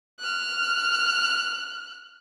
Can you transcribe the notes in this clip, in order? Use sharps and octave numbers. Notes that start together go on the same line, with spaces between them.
F6 F#6